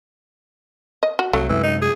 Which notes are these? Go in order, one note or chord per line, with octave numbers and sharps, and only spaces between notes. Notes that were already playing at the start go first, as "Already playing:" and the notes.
D#5
F#4
C2 F#3 A3
F#2 C3 E3 G#3
D#4
G#4